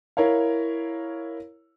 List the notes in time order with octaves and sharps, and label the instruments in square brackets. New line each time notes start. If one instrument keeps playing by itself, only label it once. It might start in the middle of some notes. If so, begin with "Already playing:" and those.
[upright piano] E4 A#4 C#5 F5